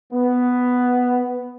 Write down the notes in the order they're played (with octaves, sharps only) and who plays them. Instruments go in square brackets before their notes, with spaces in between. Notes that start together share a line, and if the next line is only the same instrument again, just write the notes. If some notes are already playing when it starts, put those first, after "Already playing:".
[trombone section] B3